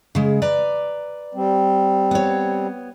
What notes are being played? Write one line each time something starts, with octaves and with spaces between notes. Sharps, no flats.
C#3 G#3
B4 D5 A#5
G3 C4
B3 C#5